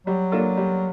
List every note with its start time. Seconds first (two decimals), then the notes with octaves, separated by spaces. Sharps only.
0.07 F#3 G3
0.32 A#3 D4 F4 A4
0.57 G3